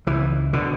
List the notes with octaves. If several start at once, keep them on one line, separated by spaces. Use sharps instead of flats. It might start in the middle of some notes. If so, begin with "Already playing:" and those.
C#2 E3
B2 D3